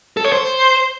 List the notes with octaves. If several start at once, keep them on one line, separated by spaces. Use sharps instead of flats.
A4
C#5
C5